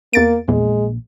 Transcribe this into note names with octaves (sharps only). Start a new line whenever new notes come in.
E2 A#3 A6 D7
A#1 E2 A#2 G#3